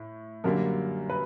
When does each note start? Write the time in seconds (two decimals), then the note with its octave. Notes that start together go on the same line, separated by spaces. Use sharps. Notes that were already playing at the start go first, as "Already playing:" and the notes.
Already playing: A2
0.44 F#2 D3 G3 A#3 A#4
1.10 B4